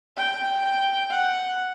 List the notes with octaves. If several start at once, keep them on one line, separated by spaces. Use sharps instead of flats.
G5
F#5